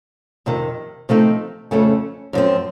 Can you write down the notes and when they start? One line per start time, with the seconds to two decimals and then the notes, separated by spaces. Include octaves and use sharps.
0.46 F2 C3 D#3
1.09 C3 F3 A3 C4 D#4
1.71 F2 C#3 A3 C#4
2.33 F#2 F3 C4